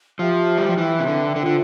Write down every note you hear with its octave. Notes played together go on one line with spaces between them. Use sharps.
F3 G4 C5 E5 G5
G3
F3
E3 B4 E5 G5
C3
D3
D3 F4 C5 G5
D3